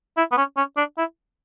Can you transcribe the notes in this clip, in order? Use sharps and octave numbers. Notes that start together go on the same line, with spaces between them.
E4
B3
C#4
C#4
D4
E4